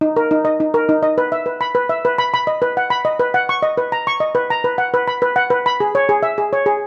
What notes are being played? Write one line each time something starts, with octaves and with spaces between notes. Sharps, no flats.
D#4
A#4
D#4
D#5
D#4
A#4
D#4
D#5
B4
E5
B4
B5
B4
E5
B4
B5
B5
D#5
B4
F#5
B5
D#5
B4
F#5
C#6
D#5
B4
A#5
C#6
D#5
B4
A#5
B4
F#5
B4
B5
B4
F#5
B4
B5
G#4
C#5
G#4
E5
G#4
C#5
G#4